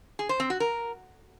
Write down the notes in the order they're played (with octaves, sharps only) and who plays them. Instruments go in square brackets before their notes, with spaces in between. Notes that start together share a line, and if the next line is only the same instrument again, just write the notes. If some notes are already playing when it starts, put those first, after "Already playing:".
[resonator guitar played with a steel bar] G#4
C5
C4
F#4
A#4